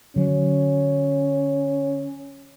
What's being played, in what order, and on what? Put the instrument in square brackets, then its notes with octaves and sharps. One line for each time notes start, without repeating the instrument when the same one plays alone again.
[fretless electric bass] D3 F#3 [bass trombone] C#4